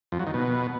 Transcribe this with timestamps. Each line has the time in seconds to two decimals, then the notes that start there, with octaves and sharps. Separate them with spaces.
0.12 F2
0.19 F#3
0.27 D#3
0.34 B2